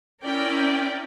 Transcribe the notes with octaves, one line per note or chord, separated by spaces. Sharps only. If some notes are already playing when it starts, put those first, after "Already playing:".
C#4 E4 A#4 D5 G5